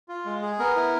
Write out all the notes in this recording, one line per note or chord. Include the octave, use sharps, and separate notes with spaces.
F4
G#3
G#4
B3 A#4
E4